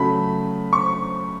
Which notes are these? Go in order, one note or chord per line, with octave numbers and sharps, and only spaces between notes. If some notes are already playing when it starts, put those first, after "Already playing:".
Already playing: C#3 F#3 A3 B5
C#6